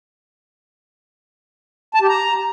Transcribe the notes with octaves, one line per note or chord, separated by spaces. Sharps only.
A5
G4
A#5